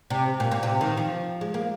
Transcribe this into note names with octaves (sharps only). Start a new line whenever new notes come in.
C3
A#2
A#2
C3
D#3
F3
G#3
A#3